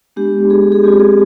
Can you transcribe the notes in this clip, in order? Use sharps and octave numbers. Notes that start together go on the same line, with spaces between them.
G#3 B3 D4 G4
G#4
G#4
G#3 C4 F4 G4
G#4